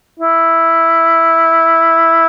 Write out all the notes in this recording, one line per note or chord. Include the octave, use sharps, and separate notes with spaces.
E4